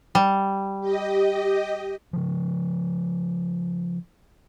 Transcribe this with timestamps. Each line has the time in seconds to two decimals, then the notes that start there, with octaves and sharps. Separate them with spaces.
0.15 G3
0.80 G4 D#5
2.13 C#3 F3